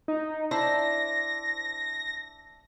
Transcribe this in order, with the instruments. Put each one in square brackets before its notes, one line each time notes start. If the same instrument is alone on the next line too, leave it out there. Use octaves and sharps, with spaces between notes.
[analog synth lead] D#4
[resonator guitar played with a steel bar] D4 E4 C5 [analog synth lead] A#6